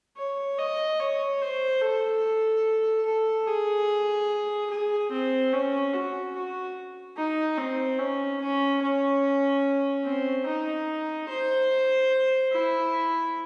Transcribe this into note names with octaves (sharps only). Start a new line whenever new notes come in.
C#5
D#5
C#5
C5
A4
A4
G#4
G#4
C4
C#4
F#4
F#4
D#4
C4
C#4
C#4
C#4
C4
D#4
C5
E4